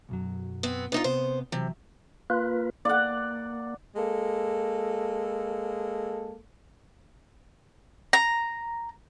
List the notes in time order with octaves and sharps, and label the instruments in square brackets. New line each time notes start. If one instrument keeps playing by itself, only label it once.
[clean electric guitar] B1 F#2 F#3
[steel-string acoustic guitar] B3 C4
[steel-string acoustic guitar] B3 D#4 F4 [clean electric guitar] D4 C5
[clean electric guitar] C3 B3 [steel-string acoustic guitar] C5
[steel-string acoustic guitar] C3 [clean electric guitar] E3 F#3
[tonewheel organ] A#3 F4 B4
[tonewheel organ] A#3 [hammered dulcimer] D5 F#5
[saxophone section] G#3 A#3 A4
[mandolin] A#5